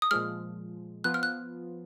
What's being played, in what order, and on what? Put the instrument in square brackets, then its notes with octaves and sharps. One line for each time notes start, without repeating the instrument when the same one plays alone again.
[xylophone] D#6
[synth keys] A#2 F3 G#3 [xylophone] F6
[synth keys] F3 B3 F4 [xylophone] F#6
[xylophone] F6
F#6